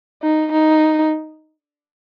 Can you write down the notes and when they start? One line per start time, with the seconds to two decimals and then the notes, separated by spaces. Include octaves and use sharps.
0.22 D#4
0.51 D#4